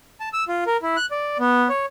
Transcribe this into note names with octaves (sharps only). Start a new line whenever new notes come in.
A5
E6
F4
A#4
E4
F#6
D5
B3
C#5